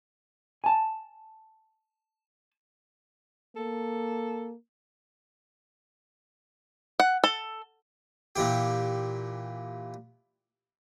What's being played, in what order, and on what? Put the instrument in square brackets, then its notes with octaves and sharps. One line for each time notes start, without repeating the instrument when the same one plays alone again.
[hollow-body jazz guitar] G#5 A5
[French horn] A#3 [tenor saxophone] A4
[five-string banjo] F#5
A4
[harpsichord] A#2 E3 G4